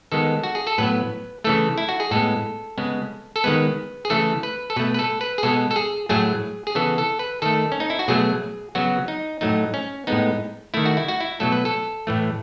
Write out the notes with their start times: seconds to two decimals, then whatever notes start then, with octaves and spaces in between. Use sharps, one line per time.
0.12 D#3 G#3 B3 A4
0.43 F#4
0.55 G#4
0.67 A4
0.78 A2 F#3 B3 B4
1.44 C#3 E3 A3 A4
1.78 E4
1.89 F#4
2.00 G#4
2.11 A2 G#3 B3 A4
2.78 C#3 G#3 B3
3.36 A4
3.44 D#3 G#3 B3 B4
4.05 G#4
4.10 C#3 E3 A3 A4
4.43 B4
4.70 A4
4.76 B2 A3 B4
4.94 B4
4.99 A4
5.21 B4
5.38 G#4
5.43 B2 G#3 B3 A4
5.71 A4
5.76 G#4
6.09 A2 F#3 A3 G#4
6.67 G#4
6.75 C#3 E3 B3 A4
6.98 A4
7.19 B4
7.42 D#3 A3 A4
7.72 C#4
7.80 D#4
7.90 E4
7.99 F#4
8.08 B2 F#3 A3 G#4
8.75 C#3 F#3 B3 F#4
9.08 D#4
9.41 A2 F#3 A3 D#4
9.74 C#4
10.07 A2 G#3 B3 D#4
10.74 D#3 A3 E4
10.85 F#4
10.97 E4
11.08 F#4
11.21 E4
11.40 B2 F#3 A3 A4
11.52 B4
11.65 A4
12.07 A2 E3 A3